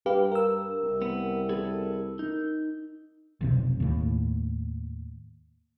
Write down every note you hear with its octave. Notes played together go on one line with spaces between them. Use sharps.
G2 G4 B4 F5
A#4 E6
C2
B3
G#4 A4 B4
D#4
F1 B1 C3
D#2 A2